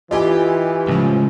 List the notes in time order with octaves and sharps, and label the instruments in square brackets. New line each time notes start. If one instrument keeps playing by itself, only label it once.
[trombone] E3 [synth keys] F4 G4 [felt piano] D#5 G#5
[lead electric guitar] C#2 [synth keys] A2 F3